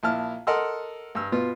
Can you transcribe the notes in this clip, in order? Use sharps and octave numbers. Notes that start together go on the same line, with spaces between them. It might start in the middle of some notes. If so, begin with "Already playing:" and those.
A#1 E4 A5 F6
A4 A#4 D#5 F#5 C6 E6
G2 E6
B2 B3 F4